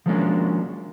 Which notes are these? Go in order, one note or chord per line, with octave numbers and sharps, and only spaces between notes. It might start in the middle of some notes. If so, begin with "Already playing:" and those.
F3 F#3 G#3 A#3 C#4 D4